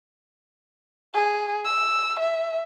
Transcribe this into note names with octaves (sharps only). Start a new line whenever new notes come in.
G#4
E6
E5